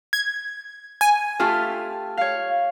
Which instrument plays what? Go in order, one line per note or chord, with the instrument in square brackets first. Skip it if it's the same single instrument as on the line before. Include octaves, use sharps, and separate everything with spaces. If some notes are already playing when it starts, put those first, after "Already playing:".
[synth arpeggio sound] G#6
G#5
[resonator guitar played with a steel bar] A3 F4 G4 [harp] F6
[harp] C#5 F5